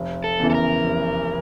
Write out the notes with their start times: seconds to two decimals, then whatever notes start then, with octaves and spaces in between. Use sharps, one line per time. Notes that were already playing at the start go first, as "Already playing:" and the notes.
Already playing: F1
0.24 A4
0.39 E2 C#3 E3
0.50 A4
0.55 A#4
0.84 F1